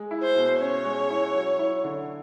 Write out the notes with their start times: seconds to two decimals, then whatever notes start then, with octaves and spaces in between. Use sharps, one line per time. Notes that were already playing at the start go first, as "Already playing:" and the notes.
Already playing: G#3
0.11 E4
0.23 C5
0.36 B2
0.60 C#4 C#5
0.85 G#3
1.10 E4
1.35 F#3
1.59 E4
1.84 D3